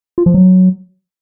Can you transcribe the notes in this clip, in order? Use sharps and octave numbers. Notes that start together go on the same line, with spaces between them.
F4
F3
F#3